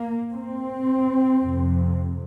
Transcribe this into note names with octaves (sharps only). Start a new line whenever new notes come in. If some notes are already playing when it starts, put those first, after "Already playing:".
Already playing: A#3
C4
F2 C3